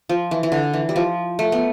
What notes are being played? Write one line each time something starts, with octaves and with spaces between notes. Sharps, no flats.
F3
E3
E3
D3
E3
G3
F3
A3
B3